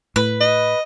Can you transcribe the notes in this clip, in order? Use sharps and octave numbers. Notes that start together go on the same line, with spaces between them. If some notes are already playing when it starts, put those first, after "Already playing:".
A2 B4
D#5